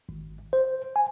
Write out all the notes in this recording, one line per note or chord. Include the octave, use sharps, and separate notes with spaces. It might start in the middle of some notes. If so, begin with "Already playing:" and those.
G#1
C5
G#5